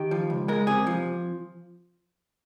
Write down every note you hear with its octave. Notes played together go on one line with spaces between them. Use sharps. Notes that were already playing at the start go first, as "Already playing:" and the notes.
Already playing: D#3 G4
F3
C#2
G#3 A#4
C3 G#4
F3